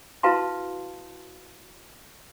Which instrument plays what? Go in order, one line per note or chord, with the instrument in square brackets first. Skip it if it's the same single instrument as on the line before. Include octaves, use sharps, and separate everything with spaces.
[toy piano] E4 F#4 B4 F5 A5 C6